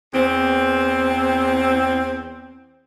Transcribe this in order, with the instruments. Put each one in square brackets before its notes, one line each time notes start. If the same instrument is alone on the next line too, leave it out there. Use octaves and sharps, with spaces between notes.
[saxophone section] E2 C4